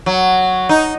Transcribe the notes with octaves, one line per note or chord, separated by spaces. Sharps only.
F#3
D#4